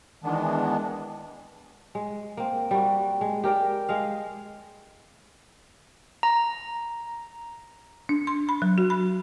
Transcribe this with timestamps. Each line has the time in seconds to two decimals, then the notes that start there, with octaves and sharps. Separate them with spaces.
0.24 D#3 E3 G#3 B3 D4
1.95 G#3
2.37 A#3 C4
2.71 G3 A#3 F#4
3.21 G#3
3.44 G4 A#4 D5 G5
3.89 G#3 D#5 F5
6.23 A#5
8.09 D4
8.27 C6
8.49 B5
8.62 F#3
8.78 F#4
8.90 B5